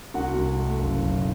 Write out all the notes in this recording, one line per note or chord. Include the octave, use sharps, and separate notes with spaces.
C2 F#4 F#5
C2
A3
F#1
B1